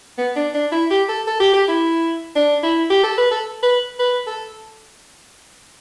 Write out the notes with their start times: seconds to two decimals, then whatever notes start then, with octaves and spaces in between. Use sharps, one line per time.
0.18 B3
0.36 D4
0.54 D4
0.72 E4
0.91 G4
1.09 A4
1.27 A4
1.40 G4
1.54 G4
1.68 E4
2.36 D4
2.63 E4
2.90 G4
3.03 A4
3.18 B4
3.31 A4
3.63 B4
3.99 B4
4.27 A4